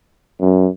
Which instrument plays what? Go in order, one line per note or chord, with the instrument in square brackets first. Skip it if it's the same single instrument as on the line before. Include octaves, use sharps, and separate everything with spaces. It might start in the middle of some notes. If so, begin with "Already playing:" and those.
[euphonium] F#2